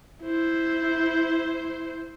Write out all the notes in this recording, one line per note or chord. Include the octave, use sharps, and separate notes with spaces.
E4 C5